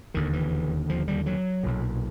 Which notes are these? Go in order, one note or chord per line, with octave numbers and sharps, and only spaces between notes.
E1 D#2 D3 D#3
E3
F3
G3
F#3
B1 A#2